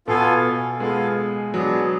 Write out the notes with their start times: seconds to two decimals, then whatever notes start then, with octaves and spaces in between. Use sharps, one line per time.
0.07 B2 B3 F4 A4 F5 G#5
0.80 G#3 B3 F4 A4 F5 G#5
1.54 F#3 B3 D4 G#4